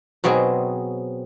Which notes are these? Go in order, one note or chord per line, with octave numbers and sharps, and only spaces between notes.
B2 F#3 C4 F#4 G#4 D#5